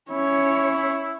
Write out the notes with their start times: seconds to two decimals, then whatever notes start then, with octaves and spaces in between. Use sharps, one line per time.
0.11 C#4 E4 C#5